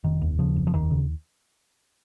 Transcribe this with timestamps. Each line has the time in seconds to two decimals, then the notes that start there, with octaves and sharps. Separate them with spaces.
0.04 F1 D#3
0.21 D#2
0.39 C#3 F3
0.56 F1
0.67 F3
0.74 D#2 D#3
0.91 C#3